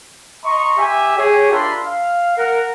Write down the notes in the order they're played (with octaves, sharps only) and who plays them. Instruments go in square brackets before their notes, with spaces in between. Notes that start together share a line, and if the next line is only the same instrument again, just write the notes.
[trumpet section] D#5 A#5 C6 C#6
G4 E5 G#5
G4 G#4 C#5
D4 F4 A#4 E5 B5 C6
F5
A#4 F#5